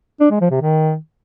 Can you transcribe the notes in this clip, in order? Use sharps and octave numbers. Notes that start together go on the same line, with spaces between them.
D4
G#3
F3
C3
D#3